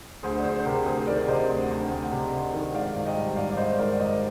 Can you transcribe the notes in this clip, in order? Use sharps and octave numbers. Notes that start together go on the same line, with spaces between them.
D2 G#4 C5
D5
D2 G#4 C5
C5
C3 G4 A#4
D2 G#4 C5
C5
D#3 A#4 D5
C3 C5 D#5
D2
D2
D2
C3
C3
D#3
G#2 D5 F5
G#1
D#5 G5
G3
G#1 D5 F5
D5
G#2 C5 D#5
G#2 A#4 D5
D5
G#1 C5 D#5